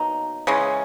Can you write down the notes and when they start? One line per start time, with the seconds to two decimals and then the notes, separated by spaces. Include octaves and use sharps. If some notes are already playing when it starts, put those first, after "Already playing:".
Already playing: B2 F#3 A#3 D#4
0.47 C#3 E3 G#3 C#4